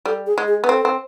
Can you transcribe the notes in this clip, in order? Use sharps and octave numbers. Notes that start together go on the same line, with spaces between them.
G3 A4
G#4
G#3
G#4
B3
C4 A4
C4